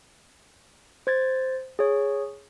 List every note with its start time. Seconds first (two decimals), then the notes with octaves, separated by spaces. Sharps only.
1.07 C5 G#6 A6
1.79 G#4 C#5